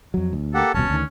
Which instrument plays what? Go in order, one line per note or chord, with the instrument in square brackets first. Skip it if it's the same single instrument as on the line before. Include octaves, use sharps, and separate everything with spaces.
[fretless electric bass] F2 F#3
D2
[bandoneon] A#3 G4 F#5 [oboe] A4
[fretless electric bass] D#1 C2 B2 [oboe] C#4 [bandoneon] A5
[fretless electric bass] D2 D#3